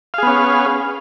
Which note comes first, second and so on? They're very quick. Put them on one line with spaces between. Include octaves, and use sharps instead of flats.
F5 G#4 B3 C#4